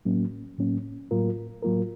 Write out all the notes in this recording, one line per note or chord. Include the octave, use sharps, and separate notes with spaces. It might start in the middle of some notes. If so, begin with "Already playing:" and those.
A2 F#3 A#3 C#4
A2 F#3 A#3 C#4
A2 F#3 A#3 F4 A#4
A2 F#3 A#3 F4 A#4